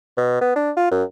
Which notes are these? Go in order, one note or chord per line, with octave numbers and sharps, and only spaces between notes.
B2
B3
D4
F4
F#2